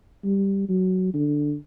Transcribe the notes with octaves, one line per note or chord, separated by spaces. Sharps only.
G3
F#3
D3